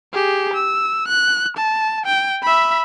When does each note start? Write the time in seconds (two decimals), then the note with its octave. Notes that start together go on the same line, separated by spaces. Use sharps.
0.14 G4 G#4
0.53 E6
1.08 F#6
1.57 A5
2.06 G5
2.43 E5 B5